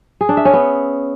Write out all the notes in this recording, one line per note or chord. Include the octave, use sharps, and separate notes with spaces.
G#4
D4
E5
C#4
B3